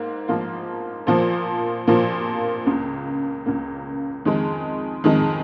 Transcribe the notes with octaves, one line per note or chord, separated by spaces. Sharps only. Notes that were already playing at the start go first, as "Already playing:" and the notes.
Already playing: G#2 A#3
G#2 F3 A#3 F4
A#2 F3 A#3
A#2 F3 A#3
C#2 C#3 A#3
C#2 C#3 A#3
F2 D#3 G#3
F2 D#3 G#3